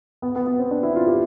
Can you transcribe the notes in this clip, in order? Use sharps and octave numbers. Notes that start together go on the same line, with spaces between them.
B3
B3
B3
C4
D4
E4
F4
G4